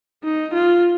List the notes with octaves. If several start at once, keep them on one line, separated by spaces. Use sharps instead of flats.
D#4
F4